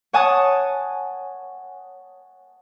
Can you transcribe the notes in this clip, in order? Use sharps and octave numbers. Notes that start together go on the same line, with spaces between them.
C#5 F#5 G#5 A5 D#6